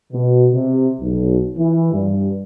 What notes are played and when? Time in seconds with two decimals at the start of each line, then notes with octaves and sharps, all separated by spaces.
0.13 B2
0.53 C3
1.01 B1
1.57 E3
1.93 G2